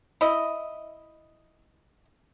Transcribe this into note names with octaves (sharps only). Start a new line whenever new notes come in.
E4 D#5